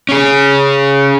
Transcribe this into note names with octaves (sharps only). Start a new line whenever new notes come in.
C#4 G#4